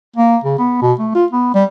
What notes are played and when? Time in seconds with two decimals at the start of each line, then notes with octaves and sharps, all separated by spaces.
0.16 A#3
0.44 C#3
0.58 B3
0.82 B2
0.99 A3
1.15 F4
1.32 B3
1.54 G3